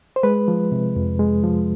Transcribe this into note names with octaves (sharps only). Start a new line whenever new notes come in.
C5
G#3 B4
F3
C3
F2
G#3
F3